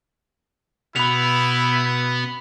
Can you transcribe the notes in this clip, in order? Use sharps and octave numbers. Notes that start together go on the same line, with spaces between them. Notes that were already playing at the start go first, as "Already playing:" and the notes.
B2 B3 E4 B5 F7